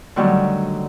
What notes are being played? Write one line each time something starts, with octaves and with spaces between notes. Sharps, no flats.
D3 D#3 F#3 G3 A3